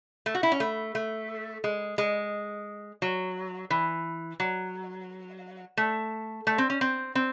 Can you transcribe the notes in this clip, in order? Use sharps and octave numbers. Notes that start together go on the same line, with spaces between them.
A3
F#4
E4
C#4
A3
A3
G#3
G#3
F#3
E3
F#3
A3
A3
C4
C#4
C4
C4